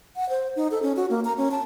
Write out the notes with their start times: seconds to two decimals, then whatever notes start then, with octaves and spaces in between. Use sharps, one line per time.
0.16 F#5
0.29 C5
0.56 D#4
0.71 A4
0.82 C#4
0.96 F#4
1.10 A#3
1.25 A#5
1.37 C#4
1.51 A5